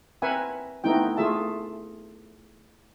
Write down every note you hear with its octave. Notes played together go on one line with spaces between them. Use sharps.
C4 A#4 B4 E5 F#5 G#5
A3 B3 C4 D#4 E4 G5
A3 F4 G#4 E5 A5